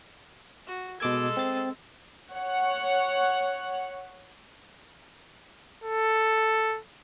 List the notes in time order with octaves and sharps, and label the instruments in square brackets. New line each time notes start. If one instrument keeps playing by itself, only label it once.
[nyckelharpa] F#4
[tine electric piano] B2 D6 G#6 [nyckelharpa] G#3 A4
[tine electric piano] C4 A6
[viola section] C#5 F#5
[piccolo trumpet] A4